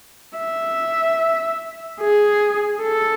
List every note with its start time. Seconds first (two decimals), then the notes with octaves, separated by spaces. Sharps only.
0.39 E5
2.01 G#4
2.82 A4